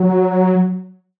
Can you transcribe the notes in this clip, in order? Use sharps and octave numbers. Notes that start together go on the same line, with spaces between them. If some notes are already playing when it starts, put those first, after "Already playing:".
Already playing: F#3